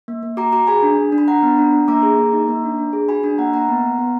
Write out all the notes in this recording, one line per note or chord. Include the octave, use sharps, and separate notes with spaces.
A#3
A#3
F#4 A#5 D6
F#4 A#5 D6
G#4 G#5 B5
D4
D4
D4
B5
D4 F#5 A#5
B3
D4
D4
A#3 A#5 D6
G#4
A#3
D#4
A#3
D4
D4
G#4
F#4 G#5 B5
D4 G#5 B5
A#3 F#5 A#5
A#3 F#5 A#5
B3
B3
B3